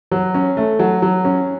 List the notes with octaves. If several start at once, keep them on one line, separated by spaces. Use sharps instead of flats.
F#3
C#4
A3
F#3
F#3
C#4